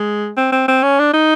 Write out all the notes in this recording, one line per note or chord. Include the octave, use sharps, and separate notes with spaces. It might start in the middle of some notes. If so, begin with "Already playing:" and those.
Already playing: G#3
C4
C4
C4
C#4
D4
D#4